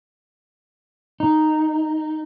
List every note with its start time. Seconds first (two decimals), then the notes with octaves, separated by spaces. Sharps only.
1.20 D#4